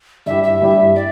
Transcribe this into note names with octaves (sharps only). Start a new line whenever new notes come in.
G2 G3 E4 G4 E5
E5
G2 G3 E4 G4
D5